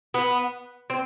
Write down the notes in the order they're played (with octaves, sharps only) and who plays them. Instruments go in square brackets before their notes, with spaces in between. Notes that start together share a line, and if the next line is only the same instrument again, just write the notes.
[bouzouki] B3
C4